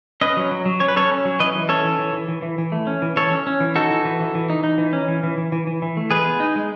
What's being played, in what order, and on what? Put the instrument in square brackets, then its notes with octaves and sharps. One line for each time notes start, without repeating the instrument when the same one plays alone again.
[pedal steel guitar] C#4 B4 D#5
F#3
F#3
F#3
C#4 C#5
B4
C#4 A4 C#5
C#4
F#3
E3 B4 D#5
E3
C#4 A4 C#5
E3
E3
E3
E3
E3
E3
A3
C#4
E3
E3 A4 C#5
C#4
C#4
E3
D#4 F#4 A4
E3
E3
E3
E3
D#4
D#4
E3
C#4
E3
E3
E3
E3
E3
E3
A3
G#3 G#4 B4
B3
D#4
G#3